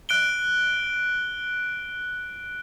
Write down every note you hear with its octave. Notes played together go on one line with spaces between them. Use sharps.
F#6 D7 G7